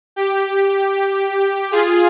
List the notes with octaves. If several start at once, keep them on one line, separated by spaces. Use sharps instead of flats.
G4
F4 G#4